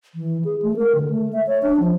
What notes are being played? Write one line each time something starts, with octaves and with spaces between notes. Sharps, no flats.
E3
G#4
A3
A#4
D3
A3
E5
C#5
D4
F3